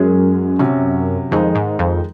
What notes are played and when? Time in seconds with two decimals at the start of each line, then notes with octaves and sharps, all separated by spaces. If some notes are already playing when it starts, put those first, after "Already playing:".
Already playing: F#2 G#3 C#4 G#4
0.59 C3 F#3 C#4
1.31 F2 D#3 G#3 D#4
1.55 G#2
1.79 F2